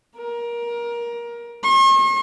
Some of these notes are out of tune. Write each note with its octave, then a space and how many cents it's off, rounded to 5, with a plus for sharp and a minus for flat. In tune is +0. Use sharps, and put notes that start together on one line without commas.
A#4 +20
C#6 -45